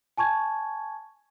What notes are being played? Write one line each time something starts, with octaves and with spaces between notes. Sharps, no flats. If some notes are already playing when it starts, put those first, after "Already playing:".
G#5 A5 C#6 G#6